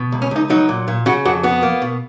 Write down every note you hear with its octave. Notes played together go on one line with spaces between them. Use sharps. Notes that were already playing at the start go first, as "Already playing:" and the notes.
Already playing: B2
C#2
C#4
C#2 D#4
F#3 D#4
A#2
A#2
C#3 F#4
F2 F#4
B3 F#4
A#3
B2